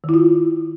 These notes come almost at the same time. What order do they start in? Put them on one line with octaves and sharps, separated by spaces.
D#3 E4 F4